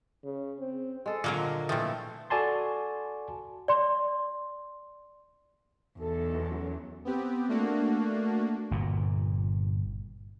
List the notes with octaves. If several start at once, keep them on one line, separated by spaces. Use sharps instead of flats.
C#3
C4
G#3 A4
A#2 D3 F#3 G#3 A#3
A#2 E3 F3 A3 C4
F#4 A4 D5 G#5 A5 C6
D5 C6
B1 E2 A4
F#2 F#3
B3 C4 G4
A3 A#3 D4 F#4
G1 A#2